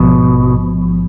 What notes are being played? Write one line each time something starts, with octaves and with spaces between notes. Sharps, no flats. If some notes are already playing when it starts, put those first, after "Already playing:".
Already playing: A1 G#2 B2 F3